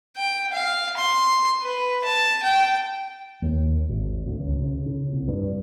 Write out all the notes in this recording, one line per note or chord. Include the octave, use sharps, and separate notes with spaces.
G5
F5
C6
B4
A5
G5
D#2
G#1
D2
C#2
C#3
C#3
C2
G2